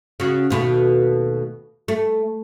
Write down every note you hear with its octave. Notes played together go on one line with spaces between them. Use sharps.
C#3 F#4
D#2 B2 A3
A3